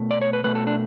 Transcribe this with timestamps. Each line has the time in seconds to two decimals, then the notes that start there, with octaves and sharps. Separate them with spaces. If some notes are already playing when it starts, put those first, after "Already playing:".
Already playing: B2 A3
0.11 D5
0.21 C#5
0.33 B4
0.44 B2 A3 B4
0.55 A4
0.67 D4